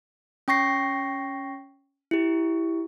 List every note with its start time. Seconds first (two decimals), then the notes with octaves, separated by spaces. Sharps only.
0.48 C#4 G5 C#6 A#6 C7
2.11 E4 G4